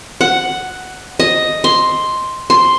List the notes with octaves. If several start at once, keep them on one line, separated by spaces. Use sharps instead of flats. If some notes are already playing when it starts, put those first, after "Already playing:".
F#5
D#5
C6
C6